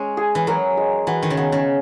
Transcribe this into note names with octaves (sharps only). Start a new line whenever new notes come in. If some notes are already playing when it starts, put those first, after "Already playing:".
Already playing: G#3 C#4 C#5
G#4
E3
F#3 A#4
G#3
E3 F#4
D#3
C#3
D#3 B3
C#3